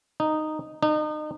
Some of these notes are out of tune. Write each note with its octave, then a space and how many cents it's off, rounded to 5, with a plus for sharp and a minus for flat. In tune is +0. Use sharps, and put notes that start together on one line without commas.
D#4 -10
D#4 -35